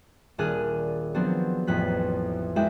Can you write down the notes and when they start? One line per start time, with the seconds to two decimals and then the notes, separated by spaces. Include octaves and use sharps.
0.38 D#1 D4 G#4 F6 F#6 D#7
1.14 F3 F#3 B3 C4 D4 F#4
1.67 A1 F2 C#4 F#6 B6
2.56 G#3 D4 E4 F#4 E5 G5